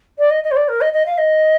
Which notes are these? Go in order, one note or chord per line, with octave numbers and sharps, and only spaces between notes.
D5
D#5
D#5
C5
D5
A#4
D#5
D#5
F5
D#5